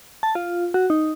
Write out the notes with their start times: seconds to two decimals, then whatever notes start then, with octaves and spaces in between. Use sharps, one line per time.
0.23 A5
0.35 F4
0.74 F#4
0.90 D#4